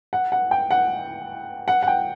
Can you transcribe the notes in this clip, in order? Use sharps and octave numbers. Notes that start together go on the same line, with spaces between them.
F#5
F#5
G5
F#5
F#5
F#5
G5